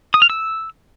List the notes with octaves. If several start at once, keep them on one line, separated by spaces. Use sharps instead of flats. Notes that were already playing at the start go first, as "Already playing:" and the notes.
D#6
F6
E6